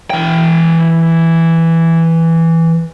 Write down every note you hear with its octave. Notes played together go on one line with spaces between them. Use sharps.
E3 G5